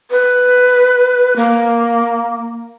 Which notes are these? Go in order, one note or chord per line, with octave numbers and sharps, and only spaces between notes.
B4
A#3